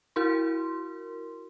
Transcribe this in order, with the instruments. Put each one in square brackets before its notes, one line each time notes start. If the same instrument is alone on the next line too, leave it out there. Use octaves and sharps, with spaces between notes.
[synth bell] E4 F#4 A#4 C6